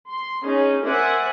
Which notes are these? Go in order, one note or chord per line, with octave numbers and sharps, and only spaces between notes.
C6
C#4 D#4 G#4
A#4 C5 D5 E5 F#5 G#5